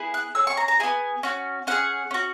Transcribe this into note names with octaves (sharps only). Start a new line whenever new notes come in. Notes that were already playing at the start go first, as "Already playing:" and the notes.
Already playing: B3 E4 G#4
F#6
C#4 G#4 E6
C#6
A#5
A#5
B3 E4 G#4 G#5
C#4 F#4
C#4 E4 G#4 F#5
C#4 F#4